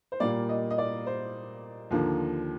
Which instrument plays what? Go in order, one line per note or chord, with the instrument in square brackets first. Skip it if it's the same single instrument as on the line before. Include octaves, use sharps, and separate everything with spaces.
[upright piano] C5
A#2 G3 A#3 D5
D#5
D#5
D5
C5
D#2 D3 F3 A#3